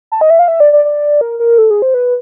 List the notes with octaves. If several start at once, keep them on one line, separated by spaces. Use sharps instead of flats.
A5
D#5
E5
F5
E5
D5
D5
D5
A#4
A#4
A4
G#4
C5
B4